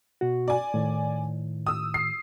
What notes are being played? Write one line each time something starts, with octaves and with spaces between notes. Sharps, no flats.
B2 F#4
D5 G#5
A2 D#3
D#6 E6
C7